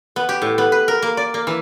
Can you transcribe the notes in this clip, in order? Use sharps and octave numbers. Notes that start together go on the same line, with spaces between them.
B3
G4
A2
B3
B4
A#4
A#3
D5
A#3
E3